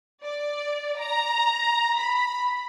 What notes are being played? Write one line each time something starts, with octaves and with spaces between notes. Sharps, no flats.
D5
A#5
B5